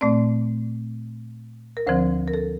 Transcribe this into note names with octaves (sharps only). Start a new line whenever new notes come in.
A#2 A3 C4 D5
A#4
D2 D3 F3 C4 C5
A#4
A4